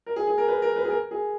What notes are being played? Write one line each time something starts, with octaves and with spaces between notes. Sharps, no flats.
A#4
G#4
G#4
A#4
B4
A#4
B4
G#4
A#4
G#4